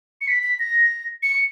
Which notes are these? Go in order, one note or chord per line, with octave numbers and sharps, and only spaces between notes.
C#7
B6
B6
A#6
C#7